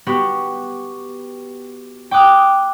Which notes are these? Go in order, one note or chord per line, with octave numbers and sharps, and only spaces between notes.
B3 F#4 G4
G5 D6 D#6 F#6